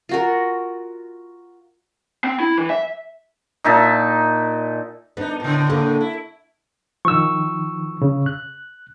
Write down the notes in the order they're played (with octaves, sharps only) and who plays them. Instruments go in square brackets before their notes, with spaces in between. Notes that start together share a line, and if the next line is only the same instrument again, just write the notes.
[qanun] F4 F#4 A#4
[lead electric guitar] C4
E4
E3
E5
[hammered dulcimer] A#2 D#4 E5 A5
[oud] B3 [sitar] D4 D#4
[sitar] A2 C#3
[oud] D3 A#3
[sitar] E4
[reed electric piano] D#3 F3 [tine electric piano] C#6 E6
[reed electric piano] C#3
F#6